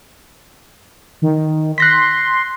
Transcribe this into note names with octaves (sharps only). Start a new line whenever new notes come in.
D#3
C6 F#6 A#6 B6